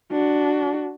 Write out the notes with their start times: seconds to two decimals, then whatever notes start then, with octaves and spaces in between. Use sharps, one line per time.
0.12 D4 F#4